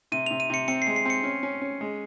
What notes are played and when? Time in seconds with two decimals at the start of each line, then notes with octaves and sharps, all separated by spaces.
0.12 C3 D#7
0.26 C3 F7
0.40 D#7
0.50 C3 C#7
0.68 C4 C#7
0.82 G#3 C7
0.96 C7
1.05 C4 C#7
1.24 C#4
1.43 C#4
1.62 C#4
1.81 G#3